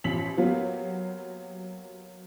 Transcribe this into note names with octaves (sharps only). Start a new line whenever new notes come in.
A1 F3 B6 F#7
F#3 A#3 B3 F4 G4